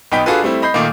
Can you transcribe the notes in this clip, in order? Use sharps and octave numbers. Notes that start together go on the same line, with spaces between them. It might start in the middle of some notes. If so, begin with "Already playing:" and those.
B1 B3 D#4 G5 B5 B6
D4 F4 F#4 G#4 A4 B4
G3 A3 C4 E4
D#5 B5 G6 C7
A#2 D#3 A3 A#3